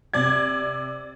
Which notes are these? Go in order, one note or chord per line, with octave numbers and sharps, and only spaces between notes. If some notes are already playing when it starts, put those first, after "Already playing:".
C3 D5 G#6